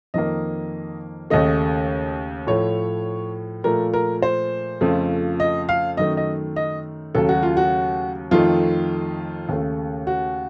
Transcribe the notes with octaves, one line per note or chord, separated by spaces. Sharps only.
F2 D#3 A#3 D#5
D#2 C#3 A3 D#5
A2 F3 A3 C#5
A#2 F3 A3 A#4
A#4
C5
F2 C#3 F3 A3
D#5
F5
F#2 D#3 A3 D#5
D#5
D#5
D#2 C#3 F#3 A3 A4
F#4
F4
F#4
F2 D#3 A3 F4
D#2 C#3 A3
F#4